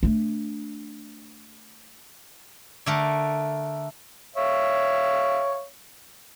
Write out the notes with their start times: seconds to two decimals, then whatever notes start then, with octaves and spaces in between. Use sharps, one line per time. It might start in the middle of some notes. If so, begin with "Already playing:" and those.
0.03 A3 D4
2.86 D3 A3 A#4
4.36 C#5 E5 F5